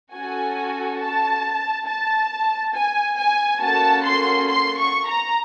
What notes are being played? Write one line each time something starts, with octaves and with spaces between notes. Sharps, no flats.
C#4 F#4 A4 G#5
A5
A5
G#5
G#5
A#3 C#4 F#4 A4 A5
C6
C6
C#6
A#5